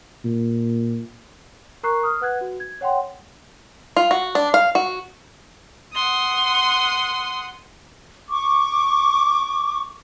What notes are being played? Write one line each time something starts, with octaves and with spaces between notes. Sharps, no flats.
A#2
A#4 A#5 C#6 F#6 C7
D#6 F6
B4 F#5 F#6 G#6
F#4
G#6
C#5 F#5 G5 C6
F4
F#4
D4
F5
F#4
F#5 C6 D#6
C#6 D6